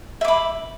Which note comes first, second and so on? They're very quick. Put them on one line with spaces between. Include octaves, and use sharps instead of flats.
E5 D6 B5